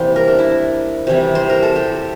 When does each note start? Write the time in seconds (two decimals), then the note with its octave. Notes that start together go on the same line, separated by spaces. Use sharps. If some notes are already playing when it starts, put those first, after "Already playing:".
Already playing: C3 E3 G3 A#3 C5
0.16 A#4
0.28 D4
0.39 E4
1.07 C3 E3 G3
1.35 C5
1.49 A#4
1.63 A4
1.76 G4